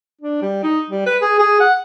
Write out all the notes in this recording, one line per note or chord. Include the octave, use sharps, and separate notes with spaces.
D4
G3
D#4
G3
B4
G#4
G#4
F#5